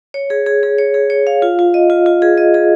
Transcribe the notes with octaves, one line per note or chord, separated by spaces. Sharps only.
C#5
G#4
G#4
G#4
C#5
G#4
C#5
F5
F4
F4
D#5
F4
F4
G#4
D#5
G#4